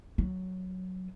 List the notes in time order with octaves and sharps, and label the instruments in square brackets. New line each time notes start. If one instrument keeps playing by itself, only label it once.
[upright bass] F#3